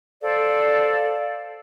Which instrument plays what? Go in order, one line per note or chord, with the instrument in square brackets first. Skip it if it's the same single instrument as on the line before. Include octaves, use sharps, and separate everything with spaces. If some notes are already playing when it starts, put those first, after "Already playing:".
[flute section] A4 C5 D5 F5